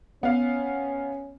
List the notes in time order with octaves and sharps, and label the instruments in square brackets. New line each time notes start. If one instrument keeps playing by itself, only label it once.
[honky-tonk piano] B3 F5 [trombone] C#4